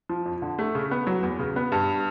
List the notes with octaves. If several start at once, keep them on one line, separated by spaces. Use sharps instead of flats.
F3
F2
D3
A3
C#3
B3
F#3
E2
C#3
B3
G2